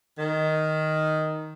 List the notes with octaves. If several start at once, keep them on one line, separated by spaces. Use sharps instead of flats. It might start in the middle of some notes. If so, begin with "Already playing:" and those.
D#3